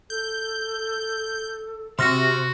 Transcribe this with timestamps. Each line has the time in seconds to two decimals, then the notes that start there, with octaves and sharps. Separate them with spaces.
0.10 A4 G6
1.99 C3 F#4 C6 F6 A#6